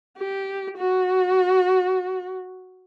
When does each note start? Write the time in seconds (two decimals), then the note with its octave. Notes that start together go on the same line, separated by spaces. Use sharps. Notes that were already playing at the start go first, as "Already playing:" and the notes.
0.18 G4
0.77 F#4